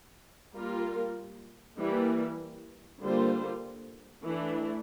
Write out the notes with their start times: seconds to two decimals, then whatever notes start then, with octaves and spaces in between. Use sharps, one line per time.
0.55 G3 A#3 F4 A#4
1.78 E3 G3 A#3
3.01 D3 G3 A#3 F4 C5
4.24 E3 A3 D4